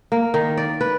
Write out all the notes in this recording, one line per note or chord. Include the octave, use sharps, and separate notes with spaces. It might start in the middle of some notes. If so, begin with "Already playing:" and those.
A#3
D#3
D5
B4